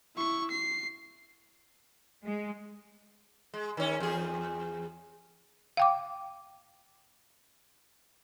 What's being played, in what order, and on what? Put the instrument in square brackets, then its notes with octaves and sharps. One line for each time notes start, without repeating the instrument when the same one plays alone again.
[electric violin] E4 C#6
C7
[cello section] G#3
[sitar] G#3
D#3 C#4
E2 G#4
[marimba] F5 G5 D6